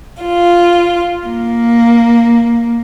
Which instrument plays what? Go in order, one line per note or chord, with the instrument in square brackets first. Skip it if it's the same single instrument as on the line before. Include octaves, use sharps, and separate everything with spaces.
[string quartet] F4
A#3